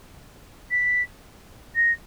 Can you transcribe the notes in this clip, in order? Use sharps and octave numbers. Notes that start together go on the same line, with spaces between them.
B6
A#6